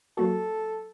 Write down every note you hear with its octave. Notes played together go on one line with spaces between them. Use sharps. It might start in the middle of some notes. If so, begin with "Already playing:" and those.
F#3 A#3 F#4 A4